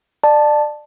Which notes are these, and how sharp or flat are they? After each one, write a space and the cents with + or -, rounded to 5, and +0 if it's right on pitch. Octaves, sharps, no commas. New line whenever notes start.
D5 +25 A5 +0